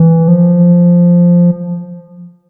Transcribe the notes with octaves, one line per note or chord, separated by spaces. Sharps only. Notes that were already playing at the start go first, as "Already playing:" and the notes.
Already playing: E3
F3